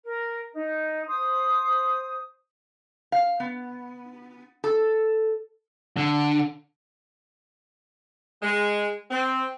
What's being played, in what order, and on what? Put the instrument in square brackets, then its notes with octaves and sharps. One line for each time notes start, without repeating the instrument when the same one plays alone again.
[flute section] A#4
D#4
C5 D#6
[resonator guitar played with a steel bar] F5
B3
A4
[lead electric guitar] D3
[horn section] G#3
C4